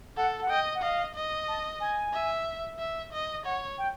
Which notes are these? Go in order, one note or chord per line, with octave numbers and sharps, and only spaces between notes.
A4 F#5
F#5
D#5 G5
F#5
D#5 F5
D#5
A5
G#5
E5
E5
D#5
C#5 F#5
G5